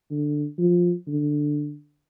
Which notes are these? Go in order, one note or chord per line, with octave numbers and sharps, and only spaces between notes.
D3
F3
D3